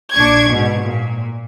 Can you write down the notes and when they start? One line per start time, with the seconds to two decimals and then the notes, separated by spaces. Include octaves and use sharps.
0.13 A#1 D4 C#6 G#6
0.49 G#2 B2
0.83 A#2